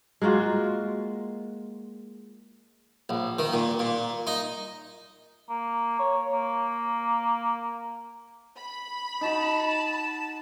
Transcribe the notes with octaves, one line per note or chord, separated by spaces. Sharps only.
G#3 A#3 F4 F#4
A#1
D#3
A#2
A#2
D#4
A#3
C#5
A#3
B5
D#4 F#4 A5